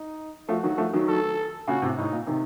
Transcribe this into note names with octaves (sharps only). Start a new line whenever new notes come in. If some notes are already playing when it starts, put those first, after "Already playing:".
Already playing: D#4
F3 A3 F#4
D#3 F#3
F3 A3
D#3 F#3
A4
A#2 C#3 F#4
A2 C3
A2 D#4
A#2
C3 D#3